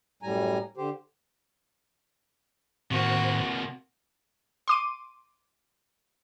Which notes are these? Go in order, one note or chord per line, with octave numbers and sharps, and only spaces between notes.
F#2 A2 G3 G#5 A#5
D3 G4 C5
A2 C3 D#3 A#3 F#4 C5
C6 D6 D#7